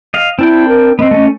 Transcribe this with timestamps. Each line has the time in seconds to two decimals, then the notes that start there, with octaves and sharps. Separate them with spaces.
0.14 D#5 F5
0.39 C4 D4 E4 G5
0.68 A#4
0.99 B3 C4 D#5
1.11 A3 C#4